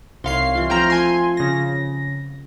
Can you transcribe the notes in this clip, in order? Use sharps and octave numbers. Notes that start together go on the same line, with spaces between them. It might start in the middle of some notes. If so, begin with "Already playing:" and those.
C2 D#4 C#5 F5 C6 C7
E3 F4
F3 A3 C4 G5 A#5 F6
G#5 C6
C#3 A#6